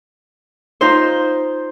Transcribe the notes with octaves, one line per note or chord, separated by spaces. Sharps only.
D#4 F4 C5